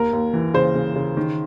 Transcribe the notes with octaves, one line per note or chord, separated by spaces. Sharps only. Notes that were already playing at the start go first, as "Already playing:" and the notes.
Already playing: D#2 A#4
D#2
E3
C#3 C5
C#3
C#3
D#3